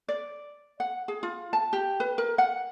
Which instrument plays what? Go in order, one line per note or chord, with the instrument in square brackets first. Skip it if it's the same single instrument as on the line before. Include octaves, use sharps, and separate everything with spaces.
[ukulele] D5
F#5
G#4
F4
A5
G4
B4
A#4
F#5